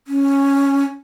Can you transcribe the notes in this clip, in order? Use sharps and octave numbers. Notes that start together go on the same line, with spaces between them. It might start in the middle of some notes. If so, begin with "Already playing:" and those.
C#4